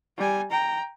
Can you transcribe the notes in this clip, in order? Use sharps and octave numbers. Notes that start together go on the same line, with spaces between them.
G3 G#5
G5 A#5